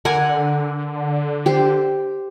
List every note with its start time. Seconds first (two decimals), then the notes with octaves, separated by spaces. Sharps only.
0.05 D3 A#4 F#5 G#5
1.46 G4 C5